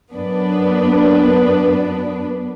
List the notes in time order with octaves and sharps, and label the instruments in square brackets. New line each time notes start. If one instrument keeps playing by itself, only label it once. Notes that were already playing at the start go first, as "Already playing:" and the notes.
[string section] F#2 B3 D4 B4